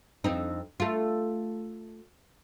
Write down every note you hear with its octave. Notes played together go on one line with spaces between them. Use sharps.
F2 C4 D#4
A3 F4